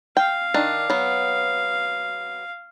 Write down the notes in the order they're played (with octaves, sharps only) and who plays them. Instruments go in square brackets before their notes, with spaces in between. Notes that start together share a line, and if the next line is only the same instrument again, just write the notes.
[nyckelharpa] F5 [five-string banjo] G5
[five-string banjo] D#3 D4
F#3 B3